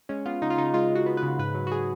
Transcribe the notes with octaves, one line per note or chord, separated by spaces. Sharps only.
G#3 C#4
B3 F4
C#3 D#4
F4
C#3 D#4
G#3 F4
G#3 F#4
B3
B4
C#3
G#2 B4
F#3
F#4
G#4